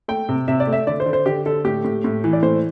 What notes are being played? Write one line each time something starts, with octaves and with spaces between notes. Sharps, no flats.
A3 G5
C3
C3 E5
D5
A3
E5
D3 D5
C5
D3
C5
D3 G4
D3 A4
A2 G4
A2
A2
E3
D5
A2 C5